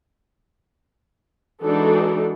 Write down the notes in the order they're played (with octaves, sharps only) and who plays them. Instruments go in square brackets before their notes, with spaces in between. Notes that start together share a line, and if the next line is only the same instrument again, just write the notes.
[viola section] E3 G#3 D4 D#4 F#4 A4